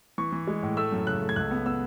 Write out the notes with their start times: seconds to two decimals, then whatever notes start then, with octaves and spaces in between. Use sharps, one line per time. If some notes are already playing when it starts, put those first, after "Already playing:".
0.18 E3 C#6
0.32 E3
0.47 G#3
0.63 A2
0.77 A3 E6
0.92 F#2
1.07 C#3 F#6
1.22 A3
1.29 G#6
1.36 C#2 F#6
1.51 B3
1.66 B3 E6